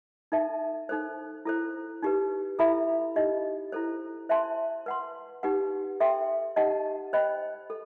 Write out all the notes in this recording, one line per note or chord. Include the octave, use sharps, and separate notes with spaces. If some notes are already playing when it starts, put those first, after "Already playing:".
D#4 A4 E5 A5
D#4 A4 C5
E4 A4 C5
D#4 G4 B4
E4 A4 E5 B5
D#4 G4 D#5
E4 A4 C5
C5 E5 A5 C6
B4 F#5 C6
D#4 G4 B4 F#5
A4 E5 G5 C6
D#4 G4 D#5 F#5 A5
C5 D#5 G5 B5
A4